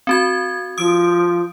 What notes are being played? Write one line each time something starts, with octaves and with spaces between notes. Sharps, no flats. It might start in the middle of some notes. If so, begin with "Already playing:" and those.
C4 F#4 G#6
F3 D#6 D7